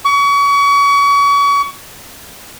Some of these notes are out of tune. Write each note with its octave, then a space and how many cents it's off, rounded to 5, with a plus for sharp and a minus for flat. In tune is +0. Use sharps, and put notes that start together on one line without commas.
C#6 +35